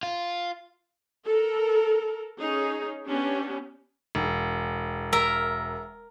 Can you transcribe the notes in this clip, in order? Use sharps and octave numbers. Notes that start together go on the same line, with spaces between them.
F4
A4 A#4
C#4 D#4 G#4
B3 C#4 D4 G4
E1
A#4 E5